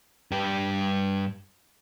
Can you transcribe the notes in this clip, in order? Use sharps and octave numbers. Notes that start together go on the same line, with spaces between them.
G2 G4